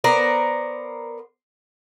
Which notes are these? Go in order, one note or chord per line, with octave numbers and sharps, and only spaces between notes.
B3 A#4 C5 D5